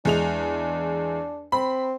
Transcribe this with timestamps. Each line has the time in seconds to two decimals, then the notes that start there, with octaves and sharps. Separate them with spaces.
0.05 E2 G#3 D4 F7
1.52 C4 B5